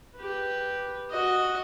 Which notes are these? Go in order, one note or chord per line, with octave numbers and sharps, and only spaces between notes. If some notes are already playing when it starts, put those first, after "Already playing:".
G4 B4
F#4 D#5